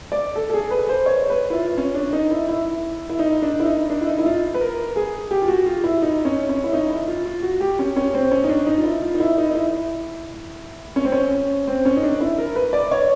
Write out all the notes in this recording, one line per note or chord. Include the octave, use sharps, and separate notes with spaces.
D5
A4
A4
G#4
B4
C5
C#5
B4
E4
F4
C#4
D4
D#4
E4
E4
E4
D#4
D4
E4
D#4
D4
E4
D#4
E4
F4
B4
A#4
G#4
G4
F4
F#4
F4
E4
D#4
C#4
C#4
E4
D#4
E4
F4
F4
F#4
G4
C#4
C#4
C4
C#4
D#4
D4
D#4
F4
E4
F4
D#4
E4
D#4
D#4
E4
C#4
C4
C#4
C4
C#4
D#4
D4
E4
A#4
B4
D5
C#5